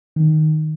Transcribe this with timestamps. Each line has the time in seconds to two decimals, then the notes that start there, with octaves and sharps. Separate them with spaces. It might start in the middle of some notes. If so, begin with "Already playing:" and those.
0.16 D#3